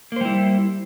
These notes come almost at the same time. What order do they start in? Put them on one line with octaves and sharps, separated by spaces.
A#3 C5 G3 E4